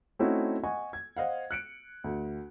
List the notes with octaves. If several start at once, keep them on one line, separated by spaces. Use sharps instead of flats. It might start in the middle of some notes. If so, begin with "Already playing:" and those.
A3 C4 C#4 D#4 E4 F#4
D#5 F#5 G#5 C#6
G#6
C5 D#5 F5 F#5
F#6 C#7 D7
D2